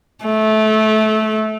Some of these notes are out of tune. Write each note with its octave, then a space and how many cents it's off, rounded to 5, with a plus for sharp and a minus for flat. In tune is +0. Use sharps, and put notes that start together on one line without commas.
A3 -20